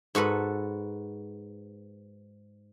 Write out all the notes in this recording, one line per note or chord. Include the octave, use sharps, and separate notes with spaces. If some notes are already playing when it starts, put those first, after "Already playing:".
G#2 F#4 A4 B4